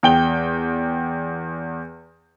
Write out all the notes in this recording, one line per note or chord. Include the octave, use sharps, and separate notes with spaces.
E2 G5 G7